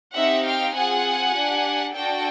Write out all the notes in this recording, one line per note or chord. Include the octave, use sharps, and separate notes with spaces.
C4 D#4 G4 E5 F#5
F5 G5
C4 F4 G#4 F#5 G#5
D4 G4
D4 F#4 A4 G5 A5